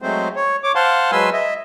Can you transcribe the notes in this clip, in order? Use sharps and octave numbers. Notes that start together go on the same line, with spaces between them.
F#3 G#3 A3 C4 C5
C#5
C#5 D6
C5 F5 F#5 A5 C6
F#3 G#3 B4 G#5 C6 E6
D#5 E5